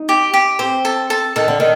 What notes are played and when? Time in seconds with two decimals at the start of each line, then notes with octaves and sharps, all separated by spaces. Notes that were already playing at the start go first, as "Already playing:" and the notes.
Already playing: D#4
0.09 G4
0.34 G4
0.59 C4 C5
0.85 A4
1.10 A4
1.36 D#3 A4
1.48 D3
1.60 D#3